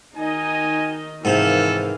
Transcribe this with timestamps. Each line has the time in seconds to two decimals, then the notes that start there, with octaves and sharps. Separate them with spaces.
0.16 D#3 D#4 D#5 G#5
1.25 G#2 C3 D#3 E3 A4 F5